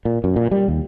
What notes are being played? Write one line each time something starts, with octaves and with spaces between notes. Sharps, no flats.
A#2
F#2
A#2
G3
D#2